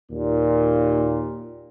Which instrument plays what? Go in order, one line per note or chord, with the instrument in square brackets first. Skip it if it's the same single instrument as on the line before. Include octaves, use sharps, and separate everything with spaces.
[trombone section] D#2 A#2